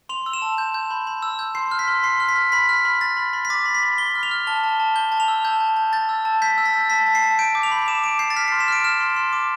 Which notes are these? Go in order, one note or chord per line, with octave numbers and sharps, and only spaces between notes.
C6 F7
E6
E7
A5
G6
G6
B5
B5
E6
G6
C6 C7
F6
B6
C6
C6 C7
F6
B6
F6
B5 B6
F6
B5
F6 A6
B5
B5
B6
D6 A6
B5
B6
B5
B5 G7
F6
F7
F6
A5 G7
A5
A5
G6 G7
A5
F7
E6
A5 G6
A5
A5
G6 A6
E6
A5
G6 B6
E6
A6
E6
A5 B6
A5
C7
A5
G6 D7
D6
F7
B5
D6 E7
D6 D7
G6 C7
A6
F6 B6
C6 C7
E7
F6 D7
F6 E7
C6
C6
D6